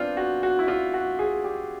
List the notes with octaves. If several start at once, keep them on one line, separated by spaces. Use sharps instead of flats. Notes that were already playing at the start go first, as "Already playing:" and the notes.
Already playing: B3 C4 D4 F4
F#4
F#4
E4
F4
F#4
G#4
G4